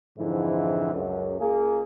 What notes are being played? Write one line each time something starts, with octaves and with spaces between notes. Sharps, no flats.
F2 G#2 D3 E3 F3 E4
C#2 F#2
C#2 A#3 G#4